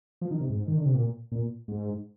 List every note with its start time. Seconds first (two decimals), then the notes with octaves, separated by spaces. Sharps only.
0.21 F3
0.31 D#3
0.41 C3
0.50 G#2
0.68 D#3
0.77 D3
0.85 C3
0.94 A#2
1.32 A#2
1.68 G#2